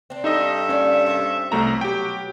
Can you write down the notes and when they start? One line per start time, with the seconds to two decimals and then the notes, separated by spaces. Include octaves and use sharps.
0.10 C4 D4
0.24 G2 D#4 A4 D#5 E5
0.69 A#3 C#4 D5
1.06 C4 A#4 A5
1.52 C2 B2 F#3 A3 A#5
1.81 G4 G5